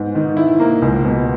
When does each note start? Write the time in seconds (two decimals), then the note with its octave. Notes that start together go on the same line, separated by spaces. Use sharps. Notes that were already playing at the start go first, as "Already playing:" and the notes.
Already playing: G#2 B3
0.15 D#3
0.37 E4
0.60 A#3
0.82 C#2
1.05 B2